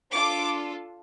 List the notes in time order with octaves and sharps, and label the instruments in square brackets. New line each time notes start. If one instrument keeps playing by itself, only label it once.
[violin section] D4 F4 A4 D6